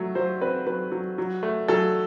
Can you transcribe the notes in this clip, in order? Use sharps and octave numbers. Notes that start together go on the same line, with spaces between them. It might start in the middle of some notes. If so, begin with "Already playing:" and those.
Already playing: F#3 A3
F#3 C5
C4 B4
F#3 B4
F#3
F#3
A3
F#3 A4